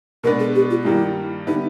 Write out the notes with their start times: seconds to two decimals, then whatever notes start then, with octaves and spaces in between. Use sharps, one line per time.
0.24 B2 G#3 B3 D4 A#4
0.39 G#4
0.55 G4
0.70 F4
0.82 F4
0.85 G2 D#3 G3 A#3 E4
1.47 D3 G3 B3 D#4 E4